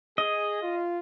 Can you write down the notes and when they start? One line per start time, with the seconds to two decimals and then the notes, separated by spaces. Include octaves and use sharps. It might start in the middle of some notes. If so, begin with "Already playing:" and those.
0.18 G#4 D#5
0.62 F4